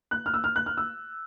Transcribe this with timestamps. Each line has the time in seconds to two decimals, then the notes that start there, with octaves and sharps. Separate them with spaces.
0.11 F#6
0.26 F6
0.34 E6
0.44 F6
0.56 F#6
0.66 F6
0.77 E6